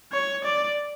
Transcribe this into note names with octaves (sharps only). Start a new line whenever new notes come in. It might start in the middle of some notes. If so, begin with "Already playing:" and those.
C#5
D5